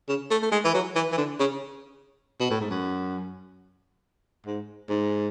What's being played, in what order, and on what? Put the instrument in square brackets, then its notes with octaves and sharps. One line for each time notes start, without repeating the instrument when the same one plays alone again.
[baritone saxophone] C#3
A3
A3
G#3
E3
F#3
E3
E3
D3
C#3
B2
A2
G#2
F#2
G#2
G#2